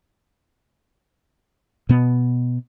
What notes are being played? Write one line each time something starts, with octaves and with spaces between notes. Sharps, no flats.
B2 B3